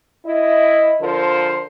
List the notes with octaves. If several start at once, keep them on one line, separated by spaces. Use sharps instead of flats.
E4 D#5
D3 F3 A#4 C5